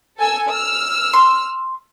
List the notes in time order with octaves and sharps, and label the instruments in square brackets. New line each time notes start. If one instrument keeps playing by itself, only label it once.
[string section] A4 G#5 E6
E6 F6
[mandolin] C6